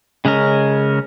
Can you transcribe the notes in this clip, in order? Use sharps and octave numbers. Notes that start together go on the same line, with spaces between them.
C#3 G#3 C#4 A#4